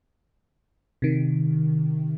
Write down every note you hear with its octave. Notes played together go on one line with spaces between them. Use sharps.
C3 D#3